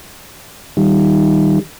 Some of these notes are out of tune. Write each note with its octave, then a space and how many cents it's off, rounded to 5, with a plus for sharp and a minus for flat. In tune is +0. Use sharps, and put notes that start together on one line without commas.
D#3 +0 G3 -10